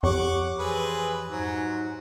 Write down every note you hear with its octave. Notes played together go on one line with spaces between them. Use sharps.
F2 G4 C#5 F#5 C#6 D6
E3 C4 G#4 B4
G#2 F#3